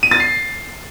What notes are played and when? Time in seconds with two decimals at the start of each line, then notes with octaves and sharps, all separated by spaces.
0.03 D#7
0.11 A6
0.20 C7